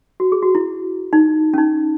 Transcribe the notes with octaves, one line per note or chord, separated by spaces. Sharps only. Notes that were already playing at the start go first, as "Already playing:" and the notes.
F#4
G#4
F#4
E4
D#4
C#4
D#4